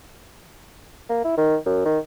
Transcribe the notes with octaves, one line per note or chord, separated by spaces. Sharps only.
A#3
E4
D#3
F#2
D#3